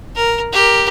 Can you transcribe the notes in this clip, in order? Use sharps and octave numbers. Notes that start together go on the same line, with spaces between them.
A#4
G4 A#4